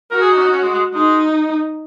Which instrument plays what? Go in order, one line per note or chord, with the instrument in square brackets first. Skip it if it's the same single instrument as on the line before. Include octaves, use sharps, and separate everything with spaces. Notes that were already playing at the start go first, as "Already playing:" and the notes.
[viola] F#4 [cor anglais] A#4
[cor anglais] G#4
D#4
C#4
D#4
C#4
G#3
G#3
[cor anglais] G#3 [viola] D#4